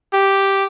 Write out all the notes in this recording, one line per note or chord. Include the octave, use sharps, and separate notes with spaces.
G4